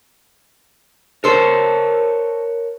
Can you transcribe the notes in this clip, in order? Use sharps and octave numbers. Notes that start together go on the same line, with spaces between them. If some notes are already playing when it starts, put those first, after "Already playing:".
A4 A#4 C5 C#5 A5